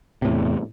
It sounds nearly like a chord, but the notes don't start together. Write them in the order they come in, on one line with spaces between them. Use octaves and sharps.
C3 A2 E2